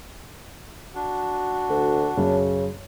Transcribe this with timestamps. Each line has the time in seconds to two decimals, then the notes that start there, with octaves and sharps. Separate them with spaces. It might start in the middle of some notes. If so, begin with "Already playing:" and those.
0.95 D4 F#4
1.70 D2
2.17 F#2 C#3